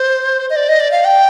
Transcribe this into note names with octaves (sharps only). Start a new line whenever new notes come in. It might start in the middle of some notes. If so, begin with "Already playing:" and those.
Already playing: C5
D#5
D5
D#5
D5
F5
G5